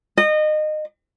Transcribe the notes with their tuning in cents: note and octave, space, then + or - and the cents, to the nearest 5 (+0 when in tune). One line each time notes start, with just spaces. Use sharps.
D#5 -25